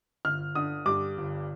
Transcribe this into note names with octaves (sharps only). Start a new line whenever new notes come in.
G1 F6
D3 D#6
G2 D6
G1